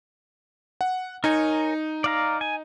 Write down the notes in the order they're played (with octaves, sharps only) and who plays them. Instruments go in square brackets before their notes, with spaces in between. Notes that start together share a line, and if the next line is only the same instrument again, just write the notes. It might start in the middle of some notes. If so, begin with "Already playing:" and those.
[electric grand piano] F#5
[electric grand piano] D#4 [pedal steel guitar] A#4 C#5 G#5
[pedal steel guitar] D5 F5 A#5
G#5